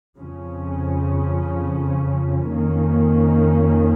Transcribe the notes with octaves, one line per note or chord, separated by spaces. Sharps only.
F2 C#3 F3 C#4
F2 D#3 A#3 C#4